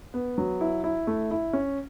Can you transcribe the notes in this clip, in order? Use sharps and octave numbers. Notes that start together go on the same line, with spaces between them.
B3
F#3
E4
E4
A3
E4
C#4